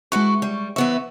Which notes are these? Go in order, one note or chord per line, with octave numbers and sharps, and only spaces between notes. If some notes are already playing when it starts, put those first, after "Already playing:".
G#3 E4 F#4 B4 C#6
G3
E3 B3 E5 C#6